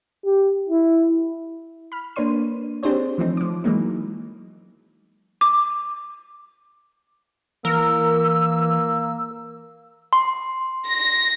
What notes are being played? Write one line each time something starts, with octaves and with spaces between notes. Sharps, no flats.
G4
E4
B5 F6
A#3 D4 B4 C#5 C6 D#7
C4 D4 G4 G#4 C5 C#5
E3 F3 A3 C4 D#4
F3 D6
E3 F#3 G#3 A#3 D#4
D6
E3 A#3 A#4 E6
C6
A#6